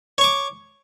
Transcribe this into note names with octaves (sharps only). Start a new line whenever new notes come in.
C#5 C#6 D6